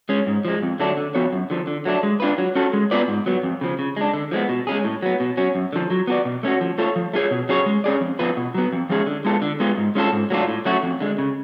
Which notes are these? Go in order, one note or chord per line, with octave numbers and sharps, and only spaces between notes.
G#3 C#4
G#2
F3 G#3
F2
D3 F#3 A3 D4
D3
F3 B3 F#4 C#5
F#2
D3 F3
D3
F#3 A3 D4
G#3
D4 F4 B4
F#3
C#4 F#4 A4
G#3
B3 F4 B4 D5
G#2
F#3 B3
F2
C#3 F3
C#3
G#3 D4
D3
F3 G#3 B3
B2
G#3 C#4 G#4
A2
F#3 B3
B2
F#3 C#4
F#2
D3 F3
F#3
B3 F#4 A4 D5
B2
A3 C#4 F#4
F3
A3 F4 A4 C#5
F3
A3 F4 G#4 C#5
B2
F#3 C#4 G#4 C#5
G#3
C#4 G#4 D5
F2
F3 B3 F4 B4
B2
F#3 B3
F2
F3 G#3 C#4 G#4
D3
G#3 B3 F4 A4
D3
G#3 B3 F4
G#2
G#3 C#4 F4 A4
G#2
F#3 A3 D4 F4
A2
F#3 A3 C#4 F#4
F2
D3 G#3
C#3